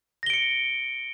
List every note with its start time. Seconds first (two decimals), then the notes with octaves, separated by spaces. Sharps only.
0.23 A#6
0.26 G7
0.30 D7
0.34 C#7